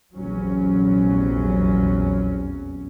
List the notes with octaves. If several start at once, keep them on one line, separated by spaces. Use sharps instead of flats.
F1 A#1 E2 F#3 C#4